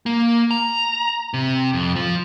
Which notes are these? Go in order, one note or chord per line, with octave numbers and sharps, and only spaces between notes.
A#3
A#5
C3
F2
F3